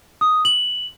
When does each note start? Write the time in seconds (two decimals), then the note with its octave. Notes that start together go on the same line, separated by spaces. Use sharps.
0.21 D#6
0.45 F#7